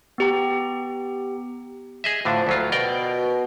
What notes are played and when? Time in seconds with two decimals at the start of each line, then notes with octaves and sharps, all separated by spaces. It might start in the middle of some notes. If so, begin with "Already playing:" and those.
0.18 B3 G4 A#5
2.04 G#4 D#5 E5
2.25 A2 D3 F3 D4
2.47 D2 F#3 F4
2.72 B2 A#4 D5 G5